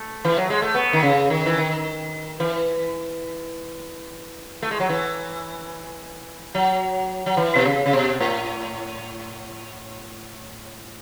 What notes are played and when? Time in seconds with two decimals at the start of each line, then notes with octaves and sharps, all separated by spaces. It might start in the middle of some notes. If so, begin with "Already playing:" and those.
Already playing: A3
0.25 E3
0.37 F#3
0.50 G#3
0.62 A3
0.75 B3
0.93 D#3
1.03 C#3
1.30 D#3
1.46 E3
1.58 D#3
2.40 E3
4.62 A3
4.71 G#3
4.80 F#3
4.89 E3
6.55 F#3
7.26 F#3
7.37 E3
7.56 B2
7.65 C#3
7.86 C#3
7.93 B2
8.20 A2